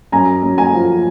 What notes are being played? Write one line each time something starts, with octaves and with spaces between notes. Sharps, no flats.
F#2 G#5 A#5
F#2
G#5 A#5
F3